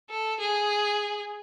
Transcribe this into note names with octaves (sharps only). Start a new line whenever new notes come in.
A4
G#4